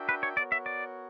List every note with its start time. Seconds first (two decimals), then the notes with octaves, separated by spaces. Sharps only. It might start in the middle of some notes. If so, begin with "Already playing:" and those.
Already playing: D4 F#4 A#4 E5 G5
0.09 B4
0.23 C#5
0.37 B3 F#4 A#4 C#5 D5 F#5
0.52 E5
0.66 D5